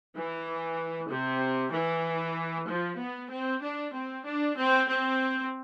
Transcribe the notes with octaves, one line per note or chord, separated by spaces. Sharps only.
E3
C3
E3
F3
B3
C4
D4
C4
D4
C4
C4